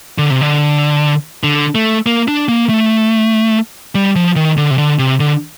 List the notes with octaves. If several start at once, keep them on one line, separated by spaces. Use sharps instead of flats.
D3
C3
D3
D3
A3
A#3
D4
A#3
A3
G3
F3
D#3
D3
C3
D3
C3
D3